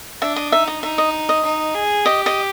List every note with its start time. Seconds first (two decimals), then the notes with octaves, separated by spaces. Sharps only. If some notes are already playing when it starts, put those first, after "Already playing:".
0.22 D4 E5
0.36 D#5
0.52 D#4 E5
0.67 D#5
0.83 D#4 E5
0.98 D#5
1.29 D#5
1.44 D#4
1.74 G#4
2.05 G4 D#5
2.26 D#5